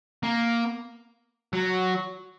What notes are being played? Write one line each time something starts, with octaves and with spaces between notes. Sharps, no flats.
A#3
F#3